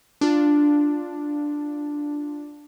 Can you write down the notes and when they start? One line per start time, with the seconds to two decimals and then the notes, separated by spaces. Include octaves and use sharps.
0.21 D4 F4